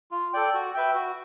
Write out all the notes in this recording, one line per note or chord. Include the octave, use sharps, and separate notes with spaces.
F4
A4 D5 G5
F#4
B4 E5 G5
F#4